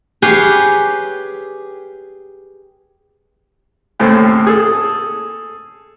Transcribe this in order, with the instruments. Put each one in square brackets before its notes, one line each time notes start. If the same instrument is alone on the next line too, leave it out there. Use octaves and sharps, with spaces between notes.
[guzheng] G4 G#4 B4 C#5 F5
[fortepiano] D#2 A2 C#3 A3 C4
G#4 A4